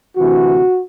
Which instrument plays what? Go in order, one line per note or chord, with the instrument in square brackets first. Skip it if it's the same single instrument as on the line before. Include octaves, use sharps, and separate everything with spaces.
[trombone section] D2 C3 E3 F#4